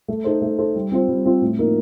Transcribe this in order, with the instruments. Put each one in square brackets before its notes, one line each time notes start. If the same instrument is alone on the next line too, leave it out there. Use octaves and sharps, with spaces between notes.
[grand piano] A3
D#4 A4 C5
A3
D#4 A4 C5
G3
C4 F4 C5
G3
C4 F4 C5
A2
F3 A#3 D#4 A#4